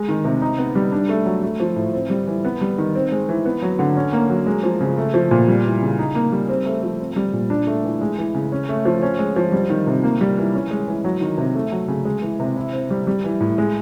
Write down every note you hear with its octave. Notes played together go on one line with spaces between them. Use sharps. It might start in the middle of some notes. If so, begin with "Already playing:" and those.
Already playing: G#3
D#3
C3
D#4
B3
G3
D4
A3
F#3
A3
F3
A2
C4
G3
E3
B3
G3
D#3
C4
G#3
E3
B3
F#3
D3
C#4
A#3
F#3
G#3
F3
C#3
A3
F3
A#2
G3
E3
C#3
D#4
A#3
G3
C4
A3
F3
C4
G3
A#2
D4
A3
E3
G#3
E3
C#3
C#4
A3
F3
C#4
G#3
F3
G3
D#3
C3
A#3
G3
E3
C#4
G#3
E3
F#3
D#3
C3
A3
F#3
C#3
G#3
E3
C3
E4
C4
G3
G3
E3
A2
G#3